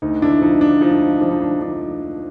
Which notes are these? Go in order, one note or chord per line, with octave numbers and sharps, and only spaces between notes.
D2 D#4
D4 E4
F3 D#4
D4
F3 D#4
F3 D4
D#4
D4
F3 D4